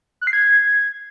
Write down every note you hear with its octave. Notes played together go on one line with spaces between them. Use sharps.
F#6
C7
G#6